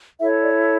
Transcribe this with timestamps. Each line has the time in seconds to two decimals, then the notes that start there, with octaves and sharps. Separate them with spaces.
0.20 E4 A4 C#5 E5
0.42 D5